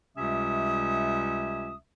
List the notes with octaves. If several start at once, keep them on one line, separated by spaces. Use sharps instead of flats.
C#2 C3 G3 C#4 E5 D#6